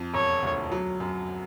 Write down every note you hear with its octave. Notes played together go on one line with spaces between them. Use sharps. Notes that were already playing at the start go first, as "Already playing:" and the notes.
Already playing: F2
E1 C#5
D2
F#3
F#2